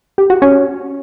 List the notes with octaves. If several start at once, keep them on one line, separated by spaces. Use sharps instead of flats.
G4
F#4
C#4